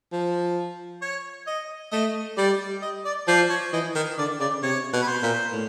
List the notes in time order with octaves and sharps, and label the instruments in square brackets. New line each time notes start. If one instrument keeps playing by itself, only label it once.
[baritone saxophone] F3
[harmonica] C#5
D#5
[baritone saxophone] A3 [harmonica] D#5
[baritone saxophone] G3 [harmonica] D5
[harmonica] D#5
D5
[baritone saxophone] F3 [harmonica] D5
[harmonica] C#5
[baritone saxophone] E3 [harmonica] D#5
[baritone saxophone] D#3 [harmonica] D#5
[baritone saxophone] D3 [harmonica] D5
[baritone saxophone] C#3 [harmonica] D5
[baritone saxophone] C3 [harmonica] C#5
[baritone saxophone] B2
[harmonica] B4
C5
[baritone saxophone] A#2
A2